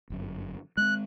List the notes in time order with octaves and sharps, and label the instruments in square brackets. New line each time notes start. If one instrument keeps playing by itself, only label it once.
[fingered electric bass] G1 F#2
[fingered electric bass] G#3 B3 C4 [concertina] F#6